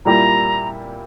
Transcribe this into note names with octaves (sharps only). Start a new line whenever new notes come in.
A#2 G3 A#3 E4 G4 A#5